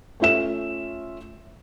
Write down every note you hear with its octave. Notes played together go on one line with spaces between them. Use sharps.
A3 C#4 F4 E5 E7